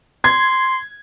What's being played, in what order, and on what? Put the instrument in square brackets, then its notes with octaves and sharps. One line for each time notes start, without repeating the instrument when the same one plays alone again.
[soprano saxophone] C6 [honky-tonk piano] G#6